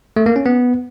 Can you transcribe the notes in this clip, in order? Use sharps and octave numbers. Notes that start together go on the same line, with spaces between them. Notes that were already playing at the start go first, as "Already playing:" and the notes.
A3
A#3
C#4
B3